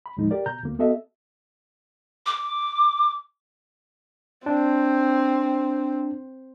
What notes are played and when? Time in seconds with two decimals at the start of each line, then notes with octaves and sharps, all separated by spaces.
0.06 B5
0.17 D#2 A2 F3 G#3 D#4
0.31 G4 A#4 D5
0.46 B2 A#5 G6
0.63 D2 A#3
0.79 B3 F#4 A4 D#5 E5
2.26 D6
4.46 C4 D4